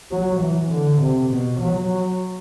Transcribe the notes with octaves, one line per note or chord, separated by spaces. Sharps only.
F#3
E3
D3
C3
B2
F#3